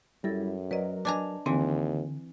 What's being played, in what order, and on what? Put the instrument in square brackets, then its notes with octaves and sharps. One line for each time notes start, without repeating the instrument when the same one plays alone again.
[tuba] F#2 [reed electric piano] G3 E4 [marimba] A4 A6 A#6
[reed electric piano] F#3 A#4 [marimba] B4 D5 D#5
[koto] D4 G#5 A#5 [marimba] B4 D#5
[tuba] D#2 [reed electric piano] D3 [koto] E3 [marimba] C4